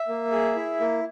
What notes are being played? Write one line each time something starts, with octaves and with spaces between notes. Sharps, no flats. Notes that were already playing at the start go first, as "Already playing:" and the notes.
Already playing: E5
A#3
G#4
E4
A#3